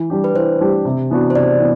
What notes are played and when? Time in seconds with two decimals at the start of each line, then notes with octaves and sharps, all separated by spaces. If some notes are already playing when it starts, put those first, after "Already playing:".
Already playing: E3
0.10 G3 D4 G4
0.24 B4
0.35 E3 C5
0.61 G3 D4 G4
0.85 C3
1.10 E3 B3 D4 F#4
1.30 C5
1.35 C3 D5
1.60 E3 B3